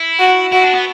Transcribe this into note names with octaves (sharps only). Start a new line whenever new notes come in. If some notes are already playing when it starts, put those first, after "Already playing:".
Already playing: E4
F#4
E4 F#4
D4
B3